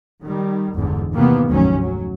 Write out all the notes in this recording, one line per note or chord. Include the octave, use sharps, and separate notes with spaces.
D#3 G3
G1 E2 G#2 D3
C3 D#3 E3 A#3 B3
F1 D2 G#2 D#3 F#3 C#4
F#3